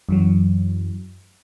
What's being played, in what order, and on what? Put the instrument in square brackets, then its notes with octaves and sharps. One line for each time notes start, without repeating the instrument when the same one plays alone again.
[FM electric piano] F#2 E3 F#3